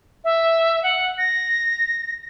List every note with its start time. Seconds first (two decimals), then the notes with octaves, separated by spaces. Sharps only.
0.24 E5
0.83 F#5
1.18 A#6